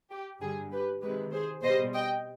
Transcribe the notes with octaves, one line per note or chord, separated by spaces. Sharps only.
G4
G2 D3 G3 G#4
G4 B4
C3 D#3 G#3 G4 B4
G#4 C5
B2 G3 C5 D#5
D#5 G5